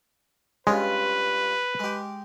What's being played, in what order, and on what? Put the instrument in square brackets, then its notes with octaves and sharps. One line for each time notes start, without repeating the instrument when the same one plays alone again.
[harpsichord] G2 C#4 F4 [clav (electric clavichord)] G#3 [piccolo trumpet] B4
[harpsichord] G#3 G4